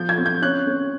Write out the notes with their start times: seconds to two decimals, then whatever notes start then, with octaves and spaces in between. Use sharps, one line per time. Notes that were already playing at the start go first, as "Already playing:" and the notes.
Already playing: F3 G6
0.09 G#6
0.18 C4
0.26 G6
0.42 C#4 F#6
0.67 C#4